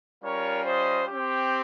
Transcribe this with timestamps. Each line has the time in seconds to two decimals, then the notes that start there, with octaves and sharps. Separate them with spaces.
0.23 G3 C#4 F4 A#4 C#5
0.66 C5 D#5
1.08 C4 G4